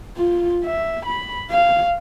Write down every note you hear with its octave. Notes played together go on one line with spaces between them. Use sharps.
F4
E5
B5
F5